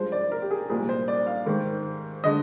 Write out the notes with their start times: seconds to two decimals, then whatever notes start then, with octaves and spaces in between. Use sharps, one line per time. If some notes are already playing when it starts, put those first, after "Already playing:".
Already playing: G2 F3 G#3 C5
0.12 D5
0.32 A#4
0.42 G4
0.51 G#4
0.69 C2 A#2 F3 G#3 G#4
0.89 C5
1.08 D5
1.27 F5
1.46 G#2 D#3 G#3
2.24 D3 G#3 D#5